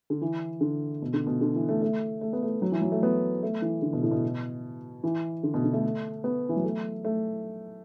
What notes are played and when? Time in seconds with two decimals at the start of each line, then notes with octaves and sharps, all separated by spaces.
0.10 D3
0.21 E3
0.61 D3
1.02 B2
1.13 D3
1.27 B2
1.41 D3
1.55 E3
1.69 A3
1.82 A3
2.21 A3
2.33 B3
2.43 A3
2.62 F#3
2.72 E3
2.82 F#3
2.92 A3
3.03 B3
3.43 A3
3.62 E3
3.82 D3
3.93 B2
4.02 A2
4.11 B2
5.03 E3
5.43 D3
5.54 B2
5.64 D3
5.73 A3
6.24 B3
6.49 E3
6.56 F#3
6.64 A3
7.05 A3